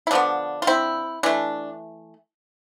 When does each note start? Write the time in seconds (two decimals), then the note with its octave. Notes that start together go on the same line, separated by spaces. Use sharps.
0.07 E4
0.11 D3 F3 B3 D4
0.62 F4
0.67 C4 E4
1.23 E3 A3 D4